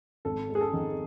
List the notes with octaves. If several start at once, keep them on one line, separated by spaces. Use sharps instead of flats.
G#1 A4
G#3
G#4
A4
D#3